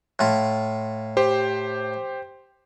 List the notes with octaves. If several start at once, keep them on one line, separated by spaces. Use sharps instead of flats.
A2 F4
G4 C5